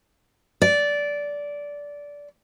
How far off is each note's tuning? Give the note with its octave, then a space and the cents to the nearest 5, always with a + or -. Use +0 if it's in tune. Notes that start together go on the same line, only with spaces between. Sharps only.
D5 -15